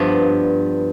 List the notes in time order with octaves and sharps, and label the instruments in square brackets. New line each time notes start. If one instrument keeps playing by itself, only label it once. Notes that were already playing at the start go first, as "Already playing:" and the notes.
Already playing: [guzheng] G2 F3 B3